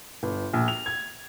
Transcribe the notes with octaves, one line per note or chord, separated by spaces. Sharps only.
G1
A#1
F7
G#6